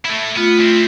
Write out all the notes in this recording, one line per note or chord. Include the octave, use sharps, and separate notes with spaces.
A3 E4
A3 B3 F4
C4 E4